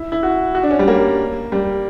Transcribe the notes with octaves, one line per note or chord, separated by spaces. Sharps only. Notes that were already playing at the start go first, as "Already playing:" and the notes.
Already playing: E4
E4
F#4
F#4
D4
C#4
G3
A#3
G3